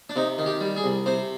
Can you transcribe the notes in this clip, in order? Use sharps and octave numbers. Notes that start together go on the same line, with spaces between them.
D4
C3 D#4
D#3
G4
G3
G#4
C2
C3 C5